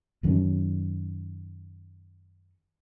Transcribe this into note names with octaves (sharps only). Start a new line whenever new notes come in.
F#2 D#3 F#3 C#4